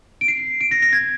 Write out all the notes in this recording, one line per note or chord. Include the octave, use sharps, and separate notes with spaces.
D7
C7
D7
A#6
A#6
G#6